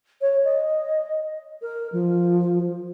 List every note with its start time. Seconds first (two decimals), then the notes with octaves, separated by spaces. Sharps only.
0.21 C#5
0.45 D#5
1.62 A#4
1.93 F3